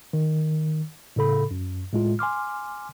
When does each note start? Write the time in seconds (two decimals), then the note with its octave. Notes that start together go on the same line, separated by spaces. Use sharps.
0.13 D#3
1.16 A2 C#3 A4 B5
1.51 F#2
1.93 A2 G#3 F4
2.19 G#5 C6 D6 F6